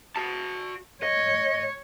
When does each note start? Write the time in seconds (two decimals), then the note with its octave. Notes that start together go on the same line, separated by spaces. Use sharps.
0.16 F#4 A5
1.03 C#5 D#5